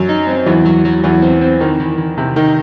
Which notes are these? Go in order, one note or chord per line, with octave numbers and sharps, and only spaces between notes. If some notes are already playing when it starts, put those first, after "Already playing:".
Already playing: F#2 F#3
D#4
C4
E2 E3 F#3
F#3
F#3
E2 E3 F#3
C4
C4
D#3 E3
E3
E3
C3 E3
D#3 D#4